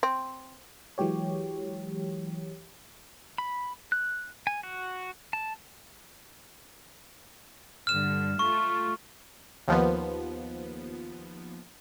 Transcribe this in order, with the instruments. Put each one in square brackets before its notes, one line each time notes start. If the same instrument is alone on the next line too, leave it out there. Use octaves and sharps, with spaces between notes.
[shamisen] C4
[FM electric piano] E3 F#3 G#3 G4 C#5
[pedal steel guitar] B5
F#6
G#5
F#4
A5
[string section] G2 D3 [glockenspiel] F6 E7
[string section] A3 F4 [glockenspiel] C#6
[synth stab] D#2 F3 B3